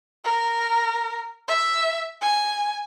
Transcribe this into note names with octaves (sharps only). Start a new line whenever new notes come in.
A#4
E5
G#5